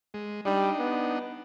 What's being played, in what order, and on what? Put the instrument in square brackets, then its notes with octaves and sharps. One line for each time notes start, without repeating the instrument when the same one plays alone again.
[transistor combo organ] G#3
[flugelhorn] G3 [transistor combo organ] D4 D#4
[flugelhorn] B3